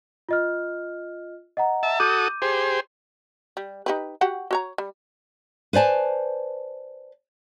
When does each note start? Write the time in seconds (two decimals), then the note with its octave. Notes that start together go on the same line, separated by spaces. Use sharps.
0.29 F4 D#5 F6
1.57 D#5 F#5 A#5
1.83 E5 A5
2.00 F#4 A4 D6 D#6 G6 D#7
2.42 G4 G#4 C5
3.57 G3
3.86 D#4 G4 B4
4.21 F#4 G4 F#5
4.51 F#4 C#5 A#5
4.78 G3
5.73 B4 C5 D5 G#5 A5